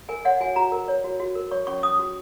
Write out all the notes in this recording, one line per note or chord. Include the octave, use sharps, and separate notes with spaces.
A#4 G#5
C#5 F#5
F#4 G#5
F#4 A#5
A#4
C#5
F#4
F#4
A#4
C#5 C#6
C#4 C#6
C#4 D#6
F#4